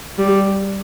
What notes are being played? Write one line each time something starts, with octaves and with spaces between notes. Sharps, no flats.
G3